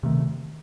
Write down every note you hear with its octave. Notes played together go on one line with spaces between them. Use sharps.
C3 D#3 A3